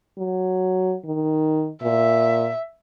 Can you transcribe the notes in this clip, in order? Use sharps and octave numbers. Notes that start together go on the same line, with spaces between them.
F#3
D#3
A#2 E5